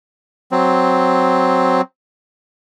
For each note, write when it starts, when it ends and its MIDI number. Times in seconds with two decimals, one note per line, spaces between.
0.52 1.81 54
0.52 1.81 60